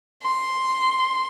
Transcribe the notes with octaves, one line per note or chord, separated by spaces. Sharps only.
C6